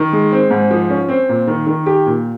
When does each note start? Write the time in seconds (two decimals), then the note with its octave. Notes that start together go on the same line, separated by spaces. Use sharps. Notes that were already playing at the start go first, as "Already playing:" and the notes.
Already playing: D#3
0.13 G#3
0.32 C4
0.51 G#2
0.71 F3
0.90 C#4
1.08 C4
1.29 A#2
1.47 D#3
1.67 D#3
1.86 G4
2.06 A#2